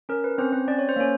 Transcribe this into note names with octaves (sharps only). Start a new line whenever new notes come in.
C#4 A#4
B4
C4 C#4 C5
C4 C5
C#4 D5
C#5
C5
A#3 C#4 C#5